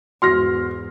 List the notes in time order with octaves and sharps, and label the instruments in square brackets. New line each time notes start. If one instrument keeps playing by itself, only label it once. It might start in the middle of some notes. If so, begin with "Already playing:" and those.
[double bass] E2 G#2 [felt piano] F#4 [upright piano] C6 F6 A#6